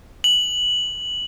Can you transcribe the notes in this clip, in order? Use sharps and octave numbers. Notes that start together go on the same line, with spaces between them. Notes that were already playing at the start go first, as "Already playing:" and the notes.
F#7